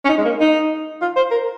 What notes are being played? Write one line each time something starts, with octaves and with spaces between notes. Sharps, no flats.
C#4
D#4
G#3
A#3
D#4
F4
C5
A#4